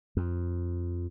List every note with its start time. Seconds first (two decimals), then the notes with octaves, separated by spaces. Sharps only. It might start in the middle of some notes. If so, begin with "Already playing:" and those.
0.17 F2